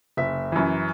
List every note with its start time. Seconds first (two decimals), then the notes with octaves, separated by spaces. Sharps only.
0.17 F#1 E5
0.52 F#2 E3